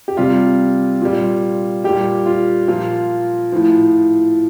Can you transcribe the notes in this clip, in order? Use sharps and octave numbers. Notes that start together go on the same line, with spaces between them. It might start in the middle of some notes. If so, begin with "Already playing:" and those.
G4
C3 G3 F4
A#2 G3
A#2 G3 G4
F4
A#2 F3 F4
A2 F3